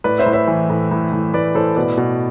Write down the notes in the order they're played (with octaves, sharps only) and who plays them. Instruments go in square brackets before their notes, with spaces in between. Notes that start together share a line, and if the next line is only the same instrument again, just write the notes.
[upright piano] A2 B4 D5
C5 E5
A2
C5 E5
E3
A2
A2
A2
A2 B4 D5
A2 A4 C5
B2 B4 D5
B2